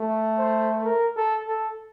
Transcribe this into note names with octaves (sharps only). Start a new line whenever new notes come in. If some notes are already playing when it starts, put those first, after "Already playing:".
Already playing: A3
C5
A#4
A4
A4